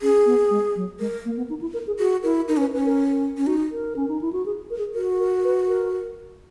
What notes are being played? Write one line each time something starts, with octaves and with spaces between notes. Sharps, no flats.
C#4 G#4
B3
G#3
F#3
G#3 A#4
A#3
B3
D#4
E4
A#4
G#4
F#4 G#4
E4 A#4
D#4 A#4
C#4 B4
C#4 B4
A#4
C#4
D#4 F#4
A#4
C#4
D#4
E4
F#4
G#4
A#4
G#4
F#4 A#4
A#4
B4
A#4